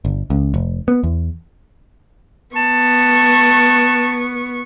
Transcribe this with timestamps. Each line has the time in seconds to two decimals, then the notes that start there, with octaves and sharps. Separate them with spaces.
0.05 G1
0.30 C#2
0.54 F1
0.88 B3
1.03 E2
2.56 B3 A5 C#6